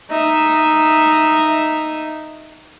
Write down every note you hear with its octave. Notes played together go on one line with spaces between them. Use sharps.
D#4 E5